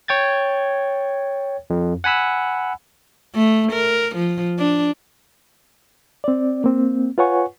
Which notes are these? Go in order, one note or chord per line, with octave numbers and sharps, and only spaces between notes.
C#5 G5 G#6 A6
F2
F#5 G#5 B5 E6
A3
A#4
F3
D4
C4 D5
A#3 C4
F4 B4 C#5 F#5 G#5 C#6